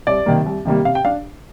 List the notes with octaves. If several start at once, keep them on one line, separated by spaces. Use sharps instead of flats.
C2 D5
C3 D#3 G3 A#3
C2
C3 D#3 G3 A#3
C3 F5
G5
D4 F5